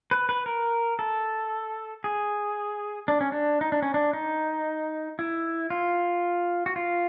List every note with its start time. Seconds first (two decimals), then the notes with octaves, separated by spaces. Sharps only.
0.11 B4
0.29 B4
0.46 A#4
0.99 A4
2.04 G#4
3.08 D4
3.21 C#4
3.32 D4
3.61 D#4
3.72 D4
3.82 C#4
3.94 D4
4.13 D#4
5.19 E4
5.70 F4
6.66 F#4
6.76 F4